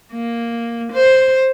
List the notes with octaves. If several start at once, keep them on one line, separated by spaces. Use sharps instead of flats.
A#3
C5